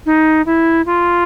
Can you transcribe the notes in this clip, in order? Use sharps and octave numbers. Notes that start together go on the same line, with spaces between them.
D#4
E4
F4